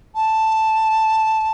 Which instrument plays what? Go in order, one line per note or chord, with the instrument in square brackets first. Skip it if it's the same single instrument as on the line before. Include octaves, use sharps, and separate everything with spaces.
[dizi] A5